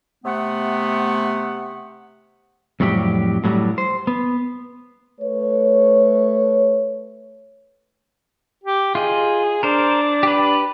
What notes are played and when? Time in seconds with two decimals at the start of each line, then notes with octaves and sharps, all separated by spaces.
0.25 C3 A3 B3 F#5
2.80 F2 A2 F#3 G3 G4
3.44 A2 F#3 G3
3.78 C5
4.07 B3
5.21 A3 B4 C#5
8.63 G4
8.95 F4 G#4 D#5
9.63 D4 A#4 C5
10.23 G4 B4